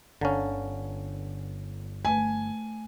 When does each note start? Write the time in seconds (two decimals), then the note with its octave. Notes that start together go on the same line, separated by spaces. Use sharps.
0.21 G1 D3 C#4 F5 A5 A#5
2.05 A3 B4 G#5